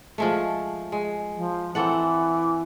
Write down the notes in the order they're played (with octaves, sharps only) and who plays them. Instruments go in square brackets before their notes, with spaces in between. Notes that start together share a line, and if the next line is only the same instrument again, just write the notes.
[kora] F3 G#3 A3
G#3
[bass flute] F3
[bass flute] E3 [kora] C4 A4 F#5